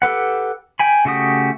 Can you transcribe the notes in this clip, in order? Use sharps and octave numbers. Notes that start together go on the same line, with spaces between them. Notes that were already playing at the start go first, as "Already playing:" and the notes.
G4 A4 B4 F#5
G5 G#5 B5
C#3 A3 F#4 G4 D#6